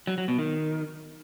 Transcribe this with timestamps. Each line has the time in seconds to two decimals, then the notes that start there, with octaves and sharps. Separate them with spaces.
0.07 F#3
0.18 F#3
0.28 B2
0.39 D#3